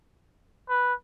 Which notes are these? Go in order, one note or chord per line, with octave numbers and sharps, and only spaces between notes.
B4